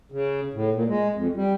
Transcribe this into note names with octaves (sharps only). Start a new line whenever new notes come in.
C#3
A2
A#2
G#3
F2
G3